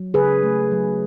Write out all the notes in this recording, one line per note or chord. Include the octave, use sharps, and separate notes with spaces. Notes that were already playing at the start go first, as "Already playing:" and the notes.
Already playing: F#3
C#3 G#4 B4
A3
F#3